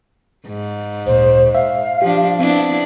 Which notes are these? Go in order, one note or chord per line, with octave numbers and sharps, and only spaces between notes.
G#2
D2 A#2 C5
E5 F5
F3 D4 G4
B3 C4 D4 E4